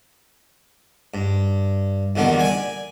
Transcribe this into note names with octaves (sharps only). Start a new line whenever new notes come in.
G2
E2 A#2 D3 D#3 G3 B3
D5 G#5